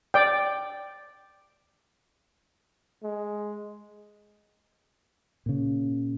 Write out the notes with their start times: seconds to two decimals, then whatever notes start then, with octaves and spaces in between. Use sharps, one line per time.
0.14 D5 G5
3.03 G#3
5.46 A#2 C#3